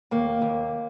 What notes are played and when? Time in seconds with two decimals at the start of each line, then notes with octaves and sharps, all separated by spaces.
0.11 D#2 A#3
0.42 D#2